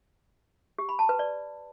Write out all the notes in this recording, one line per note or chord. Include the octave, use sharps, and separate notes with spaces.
G4
B5
A5
B4
D5